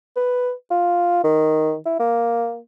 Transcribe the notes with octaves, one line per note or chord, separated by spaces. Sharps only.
B4
F4
D#3
E4
A#3